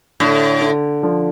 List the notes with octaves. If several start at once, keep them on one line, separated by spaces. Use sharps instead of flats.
A2 D3
D3
D3 F3